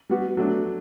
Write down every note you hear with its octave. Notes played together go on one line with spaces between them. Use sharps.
G3 B3 F#4
F#3 A3 D4